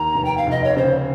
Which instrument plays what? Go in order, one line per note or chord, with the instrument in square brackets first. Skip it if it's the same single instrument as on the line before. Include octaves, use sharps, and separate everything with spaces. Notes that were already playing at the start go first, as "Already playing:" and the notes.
Already playing: [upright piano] D#2 [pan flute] A#5
[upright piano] F1
[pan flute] G5
F5
[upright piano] F1 [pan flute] D#5
[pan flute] C#5
[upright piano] C#3 [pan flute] C5